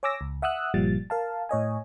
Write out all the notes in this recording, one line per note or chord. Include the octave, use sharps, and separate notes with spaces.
C#5 G#5 D6 E6 A#6
C#2
E5 F#5 D#6 E6 F#6
G1 A#2 F3 G3 A6
A#4 F5 A5
A2 C#5 D#5 G#5